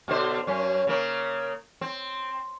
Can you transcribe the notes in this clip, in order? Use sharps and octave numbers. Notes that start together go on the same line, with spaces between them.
B2 D3 C5
F#2 C#4
C#3 A#3
C4